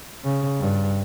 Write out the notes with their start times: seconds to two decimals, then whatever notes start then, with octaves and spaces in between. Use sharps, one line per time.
0.24 C#3
0.60 G2